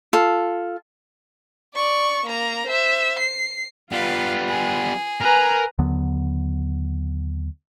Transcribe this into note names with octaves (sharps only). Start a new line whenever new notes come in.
F4 A4
D5 C#6
A#3 A#5
C5 E5
C7
G3 B3 F4 B4 F5
G#4
A#4 B4 G#5 A#5
D#2 D3 F#3 B3